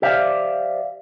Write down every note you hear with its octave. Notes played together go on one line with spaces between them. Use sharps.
G4 C5 D5 E5 F5